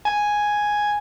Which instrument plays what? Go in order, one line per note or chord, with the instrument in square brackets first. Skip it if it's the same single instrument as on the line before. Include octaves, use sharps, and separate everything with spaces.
[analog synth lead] G#5